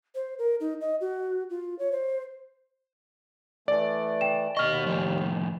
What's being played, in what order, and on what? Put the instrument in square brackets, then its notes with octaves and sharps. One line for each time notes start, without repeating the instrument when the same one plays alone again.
[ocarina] C5
A#4
D#4
D#5
F#4
F4
C#5
C5
[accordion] E3 A3 [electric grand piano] D5
[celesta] G5 E7
[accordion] D#2 [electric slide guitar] B2 D#5 [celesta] C#6 F6
[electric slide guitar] A2 D#3 F3